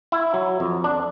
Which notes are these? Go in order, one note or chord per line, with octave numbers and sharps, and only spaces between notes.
E4
F#3
F2
D4